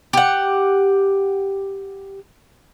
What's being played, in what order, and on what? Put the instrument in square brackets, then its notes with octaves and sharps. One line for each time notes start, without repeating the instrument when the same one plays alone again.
[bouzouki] G4 F#5